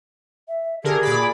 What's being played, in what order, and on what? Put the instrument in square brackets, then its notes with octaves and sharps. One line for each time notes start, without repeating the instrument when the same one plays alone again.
[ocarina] E5
[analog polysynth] D3 A#4 [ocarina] G4 [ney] G#4
[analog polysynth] A#2 D5 B5